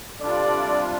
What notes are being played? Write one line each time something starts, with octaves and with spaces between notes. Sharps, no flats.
C3 G3 D4 F4 A4 D5